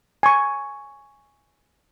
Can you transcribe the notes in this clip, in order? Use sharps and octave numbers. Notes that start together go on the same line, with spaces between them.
G#5 C#6